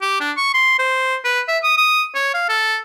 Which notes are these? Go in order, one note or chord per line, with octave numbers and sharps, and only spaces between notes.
G4
D4
C#6
C6
C5
B4
E5
D#6
D#6
C#5
F5
A4